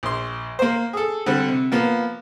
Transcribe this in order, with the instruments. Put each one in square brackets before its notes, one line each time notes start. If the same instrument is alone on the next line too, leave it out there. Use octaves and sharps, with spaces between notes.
[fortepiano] A#1 C6
A#3 C5
G#4 A4
D3 G3 C4
C3
F3 A#3 B3